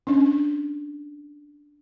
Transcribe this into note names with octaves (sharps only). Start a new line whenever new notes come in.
C#4 D4